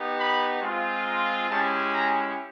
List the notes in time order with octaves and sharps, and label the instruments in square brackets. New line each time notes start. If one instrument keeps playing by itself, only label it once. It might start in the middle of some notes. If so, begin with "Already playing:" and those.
Already playing: [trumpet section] B3 D#4 G4
B5
G#3 C4 F4
A#5
G#3 C#4 E4 G4 A5
A#5